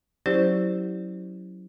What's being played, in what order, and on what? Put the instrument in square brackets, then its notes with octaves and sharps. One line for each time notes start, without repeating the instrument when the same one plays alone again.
[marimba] F#3 C#4 E4 G4 C5 D5